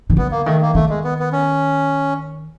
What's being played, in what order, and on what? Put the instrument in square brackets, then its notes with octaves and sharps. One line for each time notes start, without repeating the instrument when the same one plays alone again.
[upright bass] D#3
[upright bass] D3 [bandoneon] B3
[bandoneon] A#3
[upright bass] D#3 [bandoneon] A3
[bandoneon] A#3
[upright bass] D#3 [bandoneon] A3
[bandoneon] G#3
B3
B3
C#4